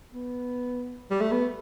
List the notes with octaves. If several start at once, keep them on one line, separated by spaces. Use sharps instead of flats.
B3
G3
A3
B3